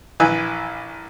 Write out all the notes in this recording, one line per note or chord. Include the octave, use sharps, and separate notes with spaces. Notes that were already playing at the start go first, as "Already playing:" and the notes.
A#1 E3 B4 G#5 E6